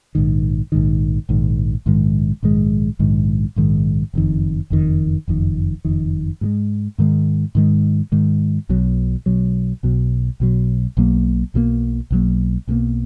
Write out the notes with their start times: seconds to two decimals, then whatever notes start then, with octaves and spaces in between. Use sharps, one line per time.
0.15 A#1 G#2 D#3
0.72 A#1 G#2 D#3
1.29 A#1 G#2 D#3
1.86 A#1 G#2 D#3 G#3
2.43 A#1 G#2 D#3 G#3
2.99 A#1 G#2 D#3 G#3
3.56 A#1 G#2 D#3 G#3
4.14 F#1 F2 D#3
4.70 F#1 F2 D#3
5.28 F#1 F2 D#3
5.85 F#1 F2 D#3
6.41 G#2 D#3 G#3
6.98 G#2 D#3 G#3
7.55 G#2 D#3 G#3
8.12 G#2 D#3 G#3
8.69 B1 B2 F#3
9.26 B1 B2 F#3
9.83 B1 B2 F#3
10.40 B1 B2 F#3
10.97 B1 B2 F#3 A#3
11.54 B1 B2 F#3 A#3
12.10 B1 B2 F#3 A#3
12.67 B1 B2 F#3 A#3